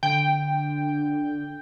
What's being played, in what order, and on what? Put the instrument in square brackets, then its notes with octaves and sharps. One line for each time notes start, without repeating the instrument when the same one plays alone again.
[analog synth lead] D3 [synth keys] G5